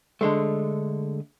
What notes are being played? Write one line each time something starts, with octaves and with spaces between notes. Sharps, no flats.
D3 G#3 A3